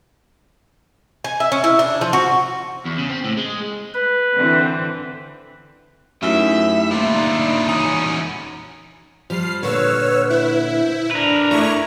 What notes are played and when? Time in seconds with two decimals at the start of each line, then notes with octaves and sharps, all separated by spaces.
1.24 G#5
1.40 E5
1.52 C#4
1.64 E4
1.79 D4
2.01 F3
2.13 F#4
2.85 E2
2.98 C#3
3.10 C4
3.24 A2
3.37 G#3
3.94 B4
4.35 D3 E3 C4
6.23 F#2 A2 D#4 E4 G4 E5
6.91 G3 A#3 F4 E5 C6
7.14 C#2 D4 D#4
7.68 E3 C#4 D#4 F#4 D#6
9.30 F3 G3 F6 C7
9.63 A#2 D3 B4 C#5 E6 F6
10.30 E4
10.76 C5
11.11 D4 A#4 B4
11.51 A3 E4 C#6 D6 G#6